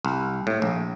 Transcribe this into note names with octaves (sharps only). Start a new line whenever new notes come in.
C2
A2
A#1